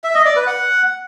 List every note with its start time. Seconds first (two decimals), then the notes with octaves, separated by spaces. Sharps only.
0.04 E5
0.15 D#5
0.25 D5
0.36 B4
0.47 F#5